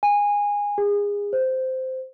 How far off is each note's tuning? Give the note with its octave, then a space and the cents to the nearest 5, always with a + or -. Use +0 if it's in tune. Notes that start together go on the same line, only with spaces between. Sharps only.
G#5 -20
G#4 -30
C5 -10